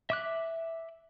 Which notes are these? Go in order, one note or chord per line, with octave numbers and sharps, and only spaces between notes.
E5 D6 F#6